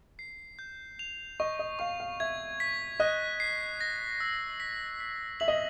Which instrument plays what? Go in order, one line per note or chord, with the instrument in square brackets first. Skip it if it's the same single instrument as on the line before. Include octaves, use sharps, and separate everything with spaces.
[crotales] C7
G6
F7
[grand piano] D#5 [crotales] C#6
[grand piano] D#5
[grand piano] F5 [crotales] C#6
[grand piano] F5
[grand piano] E5 [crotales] G#6
[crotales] B6
[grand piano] D#5 [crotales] F#6
[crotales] C7
A#6
E6
B6
B6
[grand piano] E5 [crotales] F#7
[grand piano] D#5